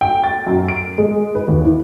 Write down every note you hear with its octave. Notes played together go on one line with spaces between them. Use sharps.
G5
A6
F#2
D7
G#3
B4
D#2
E4